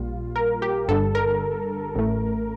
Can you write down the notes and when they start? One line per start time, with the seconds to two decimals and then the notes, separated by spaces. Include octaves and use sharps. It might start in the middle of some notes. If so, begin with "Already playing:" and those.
Already playing: A#1 A#2 G3 F4
0.36 A#4
0.62 G4
0.88 G1 G2 D3 G3 A4
1.15 A#4
1.95 A1 A2 A3